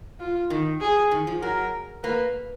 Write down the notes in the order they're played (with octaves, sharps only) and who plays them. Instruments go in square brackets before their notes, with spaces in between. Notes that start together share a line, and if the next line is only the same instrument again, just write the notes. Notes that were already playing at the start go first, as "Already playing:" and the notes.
[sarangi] F4
[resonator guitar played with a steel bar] D#3
[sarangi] G#4
[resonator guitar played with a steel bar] D#3
F3
[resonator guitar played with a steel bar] F#3 [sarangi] A#4
[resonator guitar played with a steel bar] A#3 [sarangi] B4